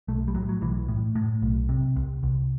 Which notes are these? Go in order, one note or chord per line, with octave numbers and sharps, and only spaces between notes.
B1 A3
G3
A2 F#3
F#3
B1 E3
A2
A2
B1
C3
C2
C2